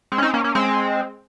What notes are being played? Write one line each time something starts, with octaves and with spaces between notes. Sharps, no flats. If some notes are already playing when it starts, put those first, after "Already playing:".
G#3 C4
C#4
C4 D#4
A#3 C#4
A#3 C#4
G#3 C4